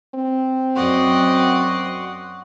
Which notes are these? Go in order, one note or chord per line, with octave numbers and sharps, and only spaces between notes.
C4
F#2 F#4 D5 D#5 F#5 C6